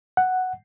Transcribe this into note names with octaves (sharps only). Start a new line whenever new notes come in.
F#5